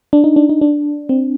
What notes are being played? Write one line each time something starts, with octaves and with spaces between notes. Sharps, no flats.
D4
D#4
D4
D#4
D4
C4